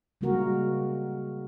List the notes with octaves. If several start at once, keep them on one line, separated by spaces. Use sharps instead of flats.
C#3 G3 G#3 A#3 F#4 A#4